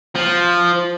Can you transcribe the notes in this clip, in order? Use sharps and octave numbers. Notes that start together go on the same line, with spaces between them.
F3